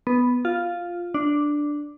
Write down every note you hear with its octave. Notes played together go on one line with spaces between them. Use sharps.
B3
F4
D4